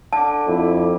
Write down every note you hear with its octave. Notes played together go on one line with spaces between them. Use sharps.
D3 A5 D6
F2 E4